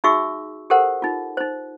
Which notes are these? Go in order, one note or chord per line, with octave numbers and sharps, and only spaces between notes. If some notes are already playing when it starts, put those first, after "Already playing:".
D#4 F#4 G#4 E5 C#6 E6
G4 A4 A#4 C5 F#5
D#4 F4
D#4 C5